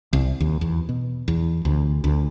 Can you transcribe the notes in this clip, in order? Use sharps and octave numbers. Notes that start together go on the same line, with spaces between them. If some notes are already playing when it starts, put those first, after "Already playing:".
C2
D#2
E2
B2
E2
D2
D2